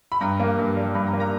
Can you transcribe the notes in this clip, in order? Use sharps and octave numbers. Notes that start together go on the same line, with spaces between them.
B5
G2 A#5
A#3
G2
G3
G2 B5
A#5
A#3
A#5